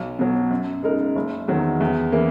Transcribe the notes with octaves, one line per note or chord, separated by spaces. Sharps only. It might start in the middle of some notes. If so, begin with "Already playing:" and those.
Already playing: B1
B2 F#3
F#2
C#3 G#3 D#4 A#4
F#1
E2 D#3 F#3
E2
C#3 E3 A#3